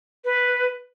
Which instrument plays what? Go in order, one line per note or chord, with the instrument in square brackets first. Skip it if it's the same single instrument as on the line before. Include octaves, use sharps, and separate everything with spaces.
[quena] B4